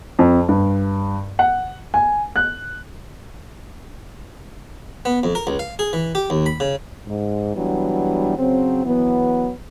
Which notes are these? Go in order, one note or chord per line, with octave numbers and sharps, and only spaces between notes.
F2
G2
F#5
G#5
F#6
B3
F2
A#4
C#2
F5
G#4
E3
G4
D#2
B5
C#3
G#2
E3 F#3 G3 B3 D4
C#3 F#3 C4
E3 F#3 B3